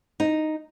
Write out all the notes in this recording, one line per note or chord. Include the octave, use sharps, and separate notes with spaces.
D#4